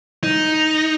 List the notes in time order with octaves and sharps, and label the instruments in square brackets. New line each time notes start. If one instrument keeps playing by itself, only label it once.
[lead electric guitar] D#4